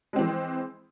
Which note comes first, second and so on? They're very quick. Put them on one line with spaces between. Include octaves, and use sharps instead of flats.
G#3 C4 E3